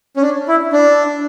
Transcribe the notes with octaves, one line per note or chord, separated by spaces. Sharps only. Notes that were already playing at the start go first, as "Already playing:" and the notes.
C#4
D4
E4
D4